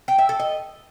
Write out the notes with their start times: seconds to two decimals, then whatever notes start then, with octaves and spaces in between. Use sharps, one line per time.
0.08 G5
0.19 E5
0.29 A4
0.40 D#5